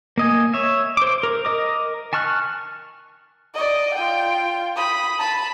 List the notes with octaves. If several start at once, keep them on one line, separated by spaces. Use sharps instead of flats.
A#3 D#5 G#5
C#5 E5
C5 D6
A#4
A#4 D#5 D6
G#5 A5 C#6 F6 F#6
D5 D#5
F4 G5
B5 D#6
A5 B5